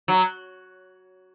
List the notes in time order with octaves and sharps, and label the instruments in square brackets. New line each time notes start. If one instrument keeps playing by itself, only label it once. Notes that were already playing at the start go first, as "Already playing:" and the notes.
[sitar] F#3